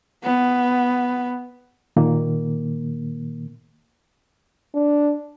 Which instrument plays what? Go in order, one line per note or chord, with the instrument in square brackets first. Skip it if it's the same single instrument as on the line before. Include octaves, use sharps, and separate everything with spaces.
[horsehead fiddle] B3
[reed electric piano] A#2 D#3 A#3
[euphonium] D4